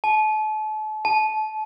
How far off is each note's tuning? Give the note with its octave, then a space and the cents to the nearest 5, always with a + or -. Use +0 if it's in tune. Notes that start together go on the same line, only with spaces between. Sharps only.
A5 -35
A5 -25